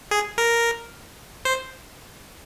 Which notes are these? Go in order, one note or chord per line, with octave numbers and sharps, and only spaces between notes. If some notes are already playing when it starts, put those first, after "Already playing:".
G#4
A#4
C5